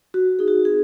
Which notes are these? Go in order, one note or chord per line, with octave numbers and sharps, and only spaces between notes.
F#4
D#4 G#4
F#4
C4 G#4